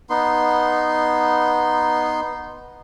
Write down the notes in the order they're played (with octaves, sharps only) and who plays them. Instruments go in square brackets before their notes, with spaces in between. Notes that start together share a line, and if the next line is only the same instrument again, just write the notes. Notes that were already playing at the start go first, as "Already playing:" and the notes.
[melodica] B3 D#4 C6